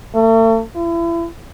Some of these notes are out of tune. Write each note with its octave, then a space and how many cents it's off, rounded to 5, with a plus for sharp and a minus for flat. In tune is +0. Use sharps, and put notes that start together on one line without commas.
A3 +40
E4 +35